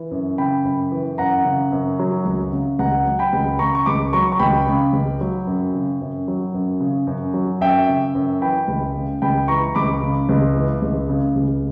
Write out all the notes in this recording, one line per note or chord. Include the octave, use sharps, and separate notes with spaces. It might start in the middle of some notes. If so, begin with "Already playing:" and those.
Already playing: E3
F#2
C#3 G5 B5
F#2
E3
F#2 F#5 A#5
C#3
F#2
F#3
C#2
C#3
C#2 F#5 A#5
F#3
G5 B5
C#2
C#3 A#5 C#6
C#6
C#2 B5 D6
F#3 A#5 C#6
C#6
C#2 G5 B5
C#3
C#2
F#3
F#2
C#3
F#2
F#3
F#2
C#3
F#2
F#3
F#2 E5 G5
C#3
F#2
E3 G5 B5
C#2
C#3
C#2 G5 B5
E3 A#5 C#6
C#2 B5 D6
C#3
C#2
E3
C#2
C#3
C#2